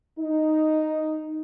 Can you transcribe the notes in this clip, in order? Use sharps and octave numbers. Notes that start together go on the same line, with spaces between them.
D#4